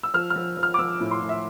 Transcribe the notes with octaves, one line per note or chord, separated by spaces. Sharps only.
E6
F3 F6
F6
F3
F3
F6
D6
F3 E6
A2
C6
A2
E5